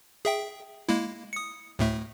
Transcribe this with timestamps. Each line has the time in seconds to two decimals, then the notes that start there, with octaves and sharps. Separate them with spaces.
0.25 G#4 E5 G5
0.89 G#3 A#3 E4
1.33 D#6 C#7
1.79 D2 A2 A3